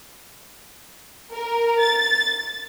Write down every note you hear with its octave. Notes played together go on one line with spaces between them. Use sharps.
A#4
A6